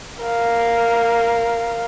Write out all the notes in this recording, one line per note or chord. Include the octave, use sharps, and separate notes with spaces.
A#4 F5